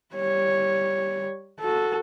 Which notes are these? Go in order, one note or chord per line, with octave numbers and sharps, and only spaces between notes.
G3 C#5
F#4 A4